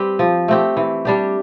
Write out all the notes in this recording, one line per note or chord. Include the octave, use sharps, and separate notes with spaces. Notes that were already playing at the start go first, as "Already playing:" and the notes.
Already playing: G3 C4 G4 B4
F3
A3 C4 G4
E3
G3 D4 G4